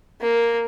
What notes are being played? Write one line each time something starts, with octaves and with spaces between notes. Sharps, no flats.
A#3